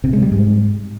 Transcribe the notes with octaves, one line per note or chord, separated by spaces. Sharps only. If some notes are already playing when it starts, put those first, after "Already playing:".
C3
G#3
G3
G#2